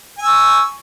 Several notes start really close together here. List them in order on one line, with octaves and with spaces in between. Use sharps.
G#5 E6 C#6